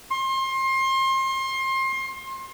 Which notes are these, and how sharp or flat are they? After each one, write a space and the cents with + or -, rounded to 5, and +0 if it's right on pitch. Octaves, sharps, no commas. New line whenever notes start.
C6 +30